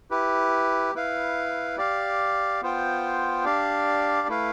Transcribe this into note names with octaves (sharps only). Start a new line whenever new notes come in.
E4 G4 B4
E4 B4 F5
G4 D5 F5
B3 F4 C5 G5
D4 G4 D5 F5
A3 E4 B4 F5